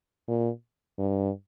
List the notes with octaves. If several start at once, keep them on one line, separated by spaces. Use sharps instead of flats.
A#2
G2